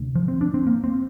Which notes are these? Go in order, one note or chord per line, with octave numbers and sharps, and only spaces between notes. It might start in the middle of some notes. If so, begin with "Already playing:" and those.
Already playing: D2 C3
F3
C4
D4
C4
A#3
C4